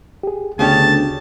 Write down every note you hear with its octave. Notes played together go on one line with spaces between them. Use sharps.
G4 G#4
D2 C#3 B3 C#4 D4 G4 C#5 A5